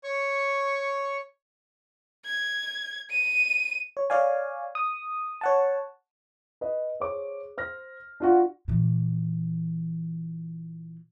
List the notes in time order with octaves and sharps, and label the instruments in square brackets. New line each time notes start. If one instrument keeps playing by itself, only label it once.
[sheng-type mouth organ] C#5 C#6
[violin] G#6
D#7
[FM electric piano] C#5
C#5 D5 F5 G#5
D#6
C#5 F#5 A5
[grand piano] B4 D#5
G#4 C5 C#5 D6
C5 F6 A#6
D4 F4 F#4
[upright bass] A#2 E3